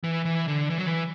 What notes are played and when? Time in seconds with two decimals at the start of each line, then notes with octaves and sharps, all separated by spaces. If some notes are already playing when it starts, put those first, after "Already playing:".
0.04 E3
0.25 E3
0.48 D3
0.70 E3
0.78 F#3
0.86 E3